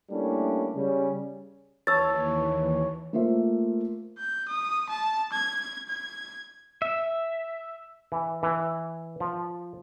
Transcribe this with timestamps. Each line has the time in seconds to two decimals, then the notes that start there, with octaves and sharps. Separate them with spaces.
0.10 G3 A3 A#3 C#4 D4 E4
0.75 C#3 G3 C#4
1.87 D#2 E3 C#5 A5 E6 A6
3.13 A3 A#3 F4 C5 E5
4.18 G6
4.49 D#6
4.90 A5
5.32 G#6
5.89 G#6
6.82 E5
8.12 E3
8.43 E3
9.20 F3